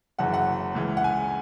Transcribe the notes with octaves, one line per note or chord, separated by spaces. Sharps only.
F#1 F#2 E3 F#5
F#5
C#2 C#3 E3
F#5
G#5